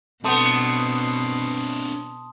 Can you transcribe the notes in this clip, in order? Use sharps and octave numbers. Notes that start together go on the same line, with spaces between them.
B2 A3 B3 C4 D4 A5 C6 D#6